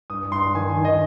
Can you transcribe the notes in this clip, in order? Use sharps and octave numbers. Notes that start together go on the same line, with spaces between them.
G2 D#6
G2 C6
D#3 G#5
G#5
D#3
D#5